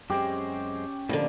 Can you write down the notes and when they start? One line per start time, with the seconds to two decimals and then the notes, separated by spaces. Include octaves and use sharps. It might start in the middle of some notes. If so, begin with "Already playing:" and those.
0.10 F#2 G#3 C4 C#4 G4 D#5
1.09 F2 A2 D3 G3 A#3 D4